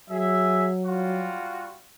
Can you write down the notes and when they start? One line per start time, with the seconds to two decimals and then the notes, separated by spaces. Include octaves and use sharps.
0.10 F#3 G#4 E5
0.85 G3 F4 F#4